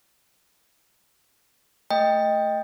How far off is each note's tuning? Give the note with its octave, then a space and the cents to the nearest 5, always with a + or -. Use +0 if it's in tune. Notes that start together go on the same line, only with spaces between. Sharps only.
A3 +5 D#5 +0 G5 +10